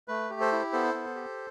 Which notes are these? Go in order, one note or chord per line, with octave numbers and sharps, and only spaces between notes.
A3 B4
G4
A4 C5
E4
B3 A4 C5
B3
G4